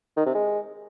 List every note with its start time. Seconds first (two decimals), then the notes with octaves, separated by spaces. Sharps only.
0.17 D#3
0.26 C3
0.35 G#3